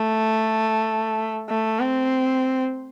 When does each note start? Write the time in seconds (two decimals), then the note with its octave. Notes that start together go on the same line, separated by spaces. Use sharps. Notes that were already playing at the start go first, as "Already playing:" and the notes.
Already playing: A3
1.49 A3
1.80 C4